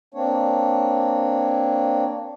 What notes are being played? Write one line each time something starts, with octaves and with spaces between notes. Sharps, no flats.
A#3 C4 D4 C#5